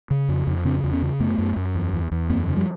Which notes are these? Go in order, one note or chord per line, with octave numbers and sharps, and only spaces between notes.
C#3
F2
F2
C#3 C4 D4
E2
B3 C#4
C#3
F#2 A3 B3
F#2
F#2
E2
E2
E2
F#2 A#3 C4
C#3
F3 G3